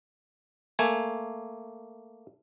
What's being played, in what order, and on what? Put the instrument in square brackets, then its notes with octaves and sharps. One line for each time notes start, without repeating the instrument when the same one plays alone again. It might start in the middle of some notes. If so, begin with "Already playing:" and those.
[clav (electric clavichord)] A3 A#3 G#5